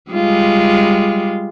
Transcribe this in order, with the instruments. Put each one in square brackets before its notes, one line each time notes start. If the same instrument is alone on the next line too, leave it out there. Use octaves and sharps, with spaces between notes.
[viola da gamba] G3 G#3 F4